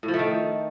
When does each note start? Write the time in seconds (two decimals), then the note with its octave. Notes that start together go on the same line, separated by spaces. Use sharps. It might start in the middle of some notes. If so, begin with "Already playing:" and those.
0.03 A2
0.08 F3
0.14 A3
0.19 D#3